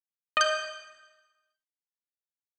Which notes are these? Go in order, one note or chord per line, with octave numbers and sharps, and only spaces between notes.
D#5 G6